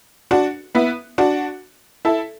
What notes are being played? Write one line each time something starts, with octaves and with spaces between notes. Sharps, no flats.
D4 F#4
B3 E4
D4 F#4
E4 A4